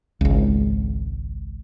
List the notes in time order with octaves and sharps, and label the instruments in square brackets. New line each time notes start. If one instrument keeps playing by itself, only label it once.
[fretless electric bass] G#1 C#2